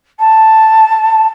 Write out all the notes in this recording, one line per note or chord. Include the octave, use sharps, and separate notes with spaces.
A5